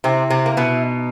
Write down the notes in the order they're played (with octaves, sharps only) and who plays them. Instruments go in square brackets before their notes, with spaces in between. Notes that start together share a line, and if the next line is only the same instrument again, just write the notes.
[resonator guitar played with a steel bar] C3 C4 [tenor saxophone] E4
[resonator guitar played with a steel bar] C3 C4
A#3
B2 B3
[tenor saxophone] D#4